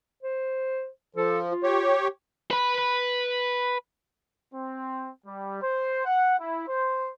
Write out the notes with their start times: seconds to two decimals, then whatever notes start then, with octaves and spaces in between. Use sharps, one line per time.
0.23 C5
1.16 F3 A4
1.50 F4
1.63 G4 C#5
2.51 B4 B5
4.54 C4
5.27 G3
5.62 C5
6.05 F#5
6.39 E4
6.69 C5